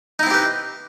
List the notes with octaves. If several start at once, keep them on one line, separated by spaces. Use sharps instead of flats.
C4 D#4 E4 G4 B4